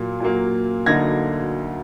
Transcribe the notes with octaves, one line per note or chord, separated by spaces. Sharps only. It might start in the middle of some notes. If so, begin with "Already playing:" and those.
Already playing: A#2 F#3 A#3
A#2 F#3 A#3
D2 D3 F#3 A#3 D#4 G#6 A#6